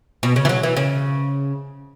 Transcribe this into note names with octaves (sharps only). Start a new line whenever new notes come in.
B2
C#3
E3
F#3
E3
C#3